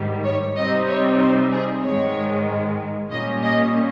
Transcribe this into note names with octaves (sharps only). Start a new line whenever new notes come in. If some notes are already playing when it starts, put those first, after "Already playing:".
Already playing: G#2 D#3 G3
C#5
C3 G3 C4 D#4 D#5
C#5
C5
G#4
G#2 D#3 G#3 C#5
A#2 G3 C#4 D#5
D#5